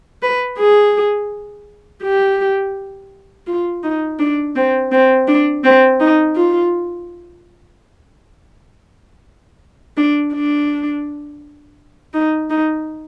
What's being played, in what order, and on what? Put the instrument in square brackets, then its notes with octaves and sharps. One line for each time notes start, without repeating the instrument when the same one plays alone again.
[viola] B4
G#4
G4
F4
D#4
D4
C4
C4
D4
C4
D#4
F4
D4
D4
D#4
D#4